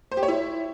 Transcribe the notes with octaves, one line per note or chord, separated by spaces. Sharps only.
C5
G4
C#5
E4